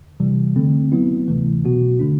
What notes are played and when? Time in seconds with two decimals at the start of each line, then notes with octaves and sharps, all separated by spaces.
0.20 C3 E3 G3
0.56 D3 A3 C4
0.92 F#3 B3 E4
1.28 D2 C3 E3 A3
1.64 C2 B2 F#3 B3 F#4
1.99 D3 A3 D4